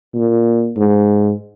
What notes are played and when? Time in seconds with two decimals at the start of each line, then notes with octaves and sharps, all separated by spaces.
0.15 A#2
0.77 G#2